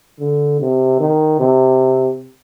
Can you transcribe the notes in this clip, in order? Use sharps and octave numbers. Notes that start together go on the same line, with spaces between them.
D3
C3
D#3
C3